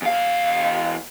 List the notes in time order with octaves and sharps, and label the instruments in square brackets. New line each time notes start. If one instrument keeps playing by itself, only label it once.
[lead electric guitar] E2 F5